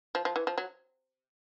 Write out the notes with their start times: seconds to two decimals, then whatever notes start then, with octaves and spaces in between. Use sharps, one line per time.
0.15 F3
0.25 F3
0.36 E3
0.47 F3
0.58 F#3